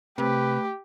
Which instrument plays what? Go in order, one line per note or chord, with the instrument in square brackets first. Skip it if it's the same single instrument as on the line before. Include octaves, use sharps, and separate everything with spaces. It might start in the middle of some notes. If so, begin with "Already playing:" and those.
[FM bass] C3 [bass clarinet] A3 [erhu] G4 [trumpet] B4